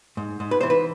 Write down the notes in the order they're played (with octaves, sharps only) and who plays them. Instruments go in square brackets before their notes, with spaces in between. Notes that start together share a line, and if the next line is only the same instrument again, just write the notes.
[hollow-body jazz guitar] G#2
G#2
B4
E3 C5
B4